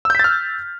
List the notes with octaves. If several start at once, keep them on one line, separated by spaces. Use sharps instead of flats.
E6 F6 G6 A6 B6